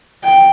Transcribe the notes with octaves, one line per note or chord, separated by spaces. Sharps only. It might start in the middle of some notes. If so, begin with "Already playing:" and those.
G5